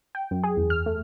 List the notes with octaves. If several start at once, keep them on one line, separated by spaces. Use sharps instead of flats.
G5
F#2
G#4
E2
F6
A3